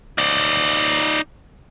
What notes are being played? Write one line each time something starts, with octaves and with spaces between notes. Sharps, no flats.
D#4 D5